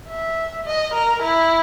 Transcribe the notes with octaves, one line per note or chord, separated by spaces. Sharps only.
E5
D#5
A#4
E4